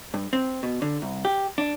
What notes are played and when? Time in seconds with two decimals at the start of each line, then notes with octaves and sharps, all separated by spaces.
0.14 G2
0.33 C4
0.63 B2
0.82 D3
1.02 C2
1.25 G4
1.58 D4